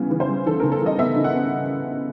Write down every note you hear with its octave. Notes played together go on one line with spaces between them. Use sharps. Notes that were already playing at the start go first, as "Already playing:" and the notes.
Already playing: C#3 E3 G3 B3
E3
C5
G3
E3 A4
C#3 A#4
A4
E3 D#5
B3 E5
C#3
F#5
B3